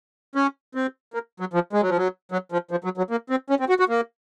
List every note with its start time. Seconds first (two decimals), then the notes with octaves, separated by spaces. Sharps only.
0.35 C#4
0.75 C4
1.14 A#3
1.40 F#3
1.53 F3
1.73 G#3
1.82 F#3
1.89 F3
1.98 F#3
2.32 F#3
2.52 F3
2.71 F3
2.84 F#3
2.98 F#3
3.10 A#3
3.30 C4
3.50 C#4
3.60 C4
3.69 F#4
3.80 F#4
3.89 A#3